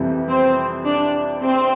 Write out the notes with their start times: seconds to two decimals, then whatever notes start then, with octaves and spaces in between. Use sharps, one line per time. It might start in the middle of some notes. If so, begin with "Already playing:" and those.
Already playing: F2 C3 E3 G3
0.28 C4
0.86 D4
1.43 C4